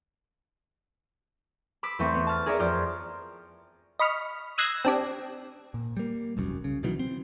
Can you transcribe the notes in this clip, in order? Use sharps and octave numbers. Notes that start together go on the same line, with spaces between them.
B5 D6 E6 B6
E2 A3 C4 E5 C#6 D#7
B3
A5 F6
G#4 A#4 C#5 D5 E5 A#5
F2 C5 D5 F6
D#5 B5 C#6 F6
D#6 E6 F#6 G#6 A#6 C7
C4 D4 G4
A#2
G3 A#3
E1 C2 F#2
C#3
B2 D#3 E3 F#3
C4